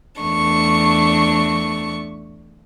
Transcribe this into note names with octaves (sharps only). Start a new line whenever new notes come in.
E2 A3 D4 C#6